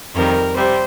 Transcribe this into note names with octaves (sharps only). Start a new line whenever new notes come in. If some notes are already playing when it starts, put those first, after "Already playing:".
F2 D#3 G3 A#4
C3 G3 C5